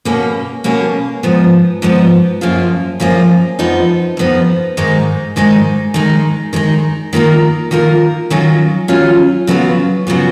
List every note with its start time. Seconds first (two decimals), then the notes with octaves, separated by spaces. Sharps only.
0.05 B2 A#3 C#4 G#4
0.64 B2 A#3 C#4 G#4
1.23 G#2 F3 B3
1.82 G#2 F3 B3
2.41 F#2 F3 A#3 F4 G#4
3.00 F#2 F3 A#3 F4 G#4
3.59 F2 F3 B3 D#4
4.17 F2 F3 B3 D#4
4.77 G#2 D#3 G#3 D#4
5.36 G#2 D#3 G#3 D#4
5.94 D#3 G#3 D#4
6.53 D#3 G#3 D#4
7.13 D#3 A#3 F4 A#4
7.71 D#3 A#3 F4 A#4
8.30 D#3 F#3 C#4 F4
8.88 D#3 F#3 C#4 F4
9.47 C#3 F#3 B3 F4
10.07 C#3 F#3 B3 F4